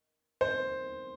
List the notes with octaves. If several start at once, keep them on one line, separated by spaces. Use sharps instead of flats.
C5